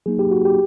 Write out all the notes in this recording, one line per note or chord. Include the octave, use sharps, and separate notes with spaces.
F#3 A#3 D#4 G#4
G4
F#4
G4